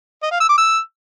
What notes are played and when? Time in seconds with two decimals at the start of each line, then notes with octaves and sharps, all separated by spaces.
0.23 D#5
0.31 F5
0.40 E6
0.49 D6
0.58 E6